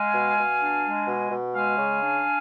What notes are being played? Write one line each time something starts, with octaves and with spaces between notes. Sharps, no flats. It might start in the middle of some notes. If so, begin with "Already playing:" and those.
Already playing: G#3 F5 G#5
B2
B2
D4
G#3
B2
B2
G#3 F5 G#5
C#3
D4